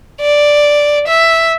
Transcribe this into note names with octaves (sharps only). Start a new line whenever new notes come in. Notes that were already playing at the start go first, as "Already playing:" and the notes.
D5
E5